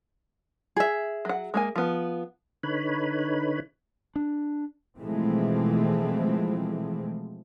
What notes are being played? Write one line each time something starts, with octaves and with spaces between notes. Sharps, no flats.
G#4 E5
F#3 F#5
G#3 A#3 G#5
F3 B3
D3 D#4 B4 C#5 B5
D4
B2 E3 F3 G#3 A3 C4